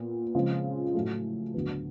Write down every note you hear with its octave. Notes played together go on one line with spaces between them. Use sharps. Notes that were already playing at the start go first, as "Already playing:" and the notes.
Already playing: A#2 B3
C#3 F3 G#3 C4 F4
A2 F#3 A3
D2 D3 F#3 B3